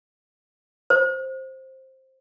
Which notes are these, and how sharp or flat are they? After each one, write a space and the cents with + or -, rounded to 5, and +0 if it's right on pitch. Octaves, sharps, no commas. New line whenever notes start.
C5 +10